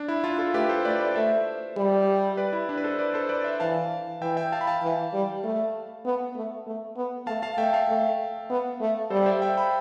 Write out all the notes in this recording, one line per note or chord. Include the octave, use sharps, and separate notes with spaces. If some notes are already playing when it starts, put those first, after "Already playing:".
Already playing: D4
E4
D4 F4
F4 A4
A3 G4 B4
A4 C5
A3 B4 D5
B4 D5
A3 C5 E5
G3
B4 D5
E4
D4
B4
A4 C5
B4 D5
A4 C5
B4 D5
C5 E5
E3 F5 A5
E3 E5 G5
E5 G5
F5 A5
B5
F5 A5
E3
G3
A3
B3
A3
A3
B3
A3 F5 A5
F5 A5
A3 E5 G5
F5 A5
A3
B3
A3
G3 A4 C5
C5 E5
E5 G5
G5 B5